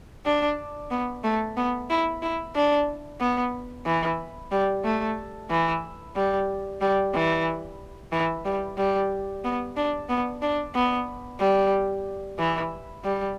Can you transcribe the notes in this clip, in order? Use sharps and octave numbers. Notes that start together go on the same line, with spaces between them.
D4
B3
A3
B3
E4
E4
D4
B3
E3
G3
A3
E3
G3
G3
E3
E3
G3
G3
B3
D4
B3
D4
B3
G3
E3
G3